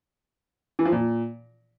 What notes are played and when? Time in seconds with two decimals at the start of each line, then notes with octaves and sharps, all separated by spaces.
0.79 E3
0.85 F3
0.92 A#2